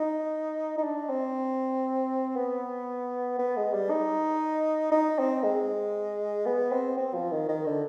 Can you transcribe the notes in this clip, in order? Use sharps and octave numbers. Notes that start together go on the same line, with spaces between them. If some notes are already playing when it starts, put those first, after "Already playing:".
Already playing: D#4
D#4
D4
C4
B3
B3
G#3
G3
D#4
D#4
C4
G#3
B3
C4
C4
F3
D#3
D#3
D3